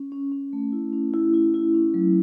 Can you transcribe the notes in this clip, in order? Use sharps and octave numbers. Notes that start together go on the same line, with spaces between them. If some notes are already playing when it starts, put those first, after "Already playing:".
Already playing: C#4
C#4
C#4
A3
E4
C#4
E4
E4
E4
C#4
F#3